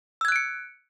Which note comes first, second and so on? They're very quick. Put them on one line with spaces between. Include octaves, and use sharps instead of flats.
E6 G#6 F#6 D7 C#7